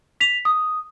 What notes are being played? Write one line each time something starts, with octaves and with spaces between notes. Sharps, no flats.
B6 F7
D#6